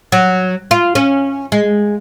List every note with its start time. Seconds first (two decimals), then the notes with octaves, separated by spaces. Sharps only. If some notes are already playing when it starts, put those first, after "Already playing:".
0.12 F#3
0.71 F4
0.95 C#4
1.52 G#3